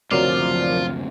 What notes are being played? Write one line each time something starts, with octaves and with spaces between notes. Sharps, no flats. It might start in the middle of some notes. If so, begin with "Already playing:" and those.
F#1 D2 C3 F3 F#3 F4 A#4 D5